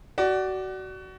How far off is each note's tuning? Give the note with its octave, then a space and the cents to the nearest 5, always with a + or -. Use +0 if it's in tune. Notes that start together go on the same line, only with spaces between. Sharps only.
F#4 +25 D5 +0